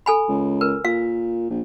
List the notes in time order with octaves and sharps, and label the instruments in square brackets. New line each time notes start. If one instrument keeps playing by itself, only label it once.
[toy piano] A4 G#5 B5
[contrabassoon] C#2
[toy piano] A#4 B4
[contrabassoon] A#2 [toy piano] F5
[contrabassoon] A#1